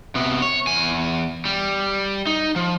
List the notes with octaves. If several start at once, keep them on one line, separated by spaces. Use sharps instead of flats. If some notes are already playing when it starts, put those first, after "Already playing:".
C3 B3
C#5
E2 G#5
G3
D#4
F3